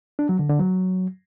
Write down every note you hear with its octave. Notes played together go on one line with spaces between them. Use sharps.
D4
F#3
D3
D3
F#3